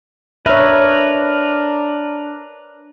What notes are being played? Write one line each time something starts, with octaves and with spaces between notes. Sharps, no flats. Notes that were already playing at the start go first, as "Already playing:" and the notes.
D4 A#4 B4 C#5 E5